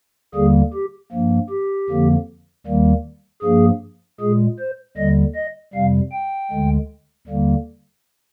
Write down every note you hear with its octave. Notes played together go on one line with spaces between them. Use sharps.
D#2 D3 G3 A#3 G#4
G4
G2 F3 A#3
G4
F2 D3 F3 A#3
D#2 D#3 G3 A#3
G2 F3 A#3 G#4
A#2 G#3 G#4
C5
D#2 D3 G3 D#5
D#5
F2 C3 G3 F5
G5
D2 D3 G#3
D#2 D3 G3 A#3